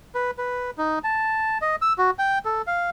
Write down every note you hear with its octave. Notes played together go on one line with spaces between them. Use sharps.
B4
B4
D#4
A5
D#5
E6
F#4
G5
A4
F5